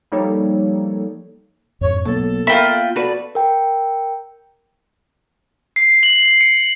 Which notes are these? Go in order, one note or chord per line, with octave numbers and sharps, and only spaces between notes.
F3 G3 A#3 D#4 A4 C#5
F2 G#2 C#5
B1 A#3 B3 A4
F4 A#4 E5 G5 B5
F#4 A4 B4 D5
A#4 G5
C7
F#7
C#7